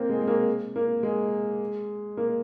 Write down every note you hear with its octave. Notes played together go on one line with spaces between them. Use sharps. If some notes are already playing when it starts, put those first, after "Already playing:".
Already playing: A#3 C4
G#3
G#3
A#3
A#3
G#3
A#3